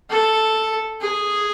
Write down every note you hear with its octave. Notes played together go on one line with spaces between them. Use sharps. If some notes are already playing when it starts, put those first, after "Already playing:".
A4
G#4